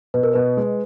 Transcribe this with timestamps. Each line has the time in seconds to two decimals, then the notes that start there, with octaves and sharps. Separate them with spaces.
0.14 B2 B4
0.23 A#4
0.33 B2 B4
0.57 G#3